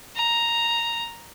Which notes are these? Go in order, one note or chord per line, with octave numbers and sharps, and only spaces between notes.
A#5